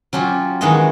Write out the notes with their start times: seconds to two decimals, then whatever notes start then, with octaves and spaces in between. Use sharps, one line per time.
0.13 F#3 C#4 F4 G4
0.61 D#3 E3 G#3 F#4 G#4 D#5